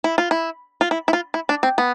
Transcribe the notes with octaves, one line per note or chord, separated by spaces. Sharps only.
E4
F4
E4
F4
E4
E4
F4
E4
D4
C4
B3